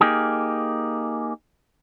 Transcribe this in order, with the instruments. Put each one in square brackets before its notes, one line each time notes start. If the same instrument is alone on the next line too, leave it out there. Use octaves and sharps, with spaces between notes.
[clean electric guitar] A#3 D#4 G4 G#4